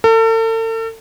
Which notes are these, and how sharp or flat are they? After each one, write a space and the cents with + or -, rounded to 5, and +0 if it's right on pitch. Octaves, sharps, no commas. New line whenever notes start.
A4 +40